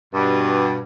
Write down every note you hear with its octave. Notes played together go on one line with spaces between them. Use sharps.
G2 B2